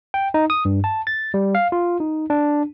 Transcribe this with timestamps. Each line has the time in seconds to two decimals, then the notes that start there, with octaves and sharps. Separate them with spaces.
0.14 G5
0.34 D#4
0.50 D#6
0.65 G2
0.84 A5
1.07 A6
1.34 G3
1.55 F5
1.72 F4
2.00 D#4
2.30 D4